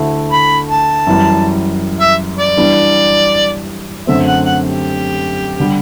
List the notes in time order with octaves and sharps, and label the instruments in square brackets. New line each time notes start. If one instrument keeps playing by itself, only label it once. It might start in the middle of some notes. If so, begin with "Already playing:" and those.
Already playing: [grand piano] D2 D3 A3 E4
[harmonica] B5
A5
[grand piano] F#2 E3 G3
[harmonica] E5
D5
[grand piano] E3 G3 D4
[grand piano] F#2 D3 A3 C4 [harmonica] E5
[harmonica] F#5
F#5
G4
[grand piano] D3 G3